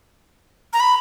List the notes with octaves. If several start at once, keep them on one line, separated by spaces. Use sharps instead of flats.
A#5
B5